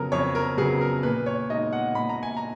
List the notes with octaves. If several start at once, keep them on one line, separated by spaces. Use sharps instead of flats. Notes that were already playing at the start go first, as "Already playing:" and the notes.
Already playing: F2 C#3 F#3 B3 A#4
F2 C#5
A#4
C#3 F#3 B3 G#4
A#4
A#2 B4
C#5
G#3 B3 D#4 D#5
F#5
A#2 B5
A#5
G#5
A#5